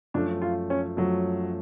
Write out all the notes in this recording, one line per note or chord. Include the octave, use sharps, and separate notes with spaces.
F#2 F3 A3 D4
F4
C#4
F#2 F3 F#3 A3